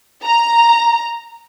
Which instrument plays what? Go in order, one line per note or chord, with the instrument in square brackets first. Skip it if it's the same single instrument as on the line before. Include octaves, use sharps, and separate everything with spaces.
[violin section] A#5